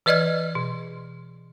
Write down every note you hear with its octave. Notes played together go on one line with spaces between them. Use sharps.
E3 B4 D5 D#5 F6 G#6
B2